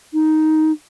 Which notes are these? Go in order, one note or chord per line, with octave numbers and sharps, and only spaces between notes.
D#4